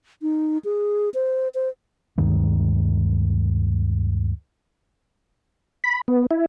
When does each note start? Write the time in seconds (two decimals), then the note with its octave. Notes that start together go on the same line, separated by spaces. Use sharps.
0.22 D#4
0.64 G#4
1.14 C5
1.55 C5
2.18 D2 G2 D#3 G#3
5.84 B5
6.08 B3
6.31 E4